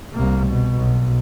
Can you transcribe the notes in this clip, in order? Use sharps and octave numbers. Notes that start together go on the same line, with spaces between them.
C2 A#3
B2
B1